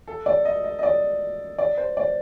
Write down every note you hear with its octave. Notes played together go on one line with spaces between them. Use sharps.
A4
D5
D#5
D#5
D#5
D5
D5
C5
D5